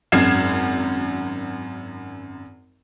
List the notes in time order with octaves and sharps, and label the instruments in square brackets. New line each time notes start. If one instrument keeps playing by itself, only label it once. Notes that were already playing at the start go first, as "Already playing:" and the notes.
[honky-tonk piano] G#1 F#2 F6 G#6 C7 E7